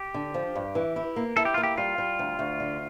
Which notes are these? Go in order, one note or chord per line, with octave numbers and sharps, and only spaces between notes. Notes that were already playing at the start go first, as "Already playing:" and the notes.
Already playing: G4
D3
F3
G2
E3
E4
A#3
E4 A4
G4
A#3 F4
G4
G3 F4
G3
D2
D2
D3